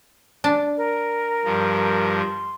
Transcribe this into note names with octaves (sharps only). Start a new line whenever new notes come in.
D4
A#4
G2 F3
C6